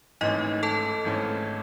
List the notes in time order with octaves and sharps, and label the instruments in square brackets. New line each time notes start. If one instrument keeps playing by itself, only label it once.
[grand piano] G#1 G#2 E3 A3 C#4 [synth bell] D#4 D#5
[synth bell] A4 A5
[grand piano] G#1 G#2 E3 A3 C#4